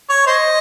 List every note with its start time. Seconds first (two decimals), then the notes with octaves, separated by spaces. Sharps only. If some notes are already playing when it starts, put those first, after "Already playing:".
0.09 C#5
0.27 C5 D#5